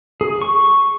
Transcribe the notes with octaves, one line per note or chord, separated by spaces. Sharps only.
G#4
C#6